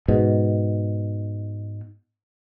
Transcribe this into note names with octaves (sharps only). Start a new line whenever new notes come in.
G#2 B2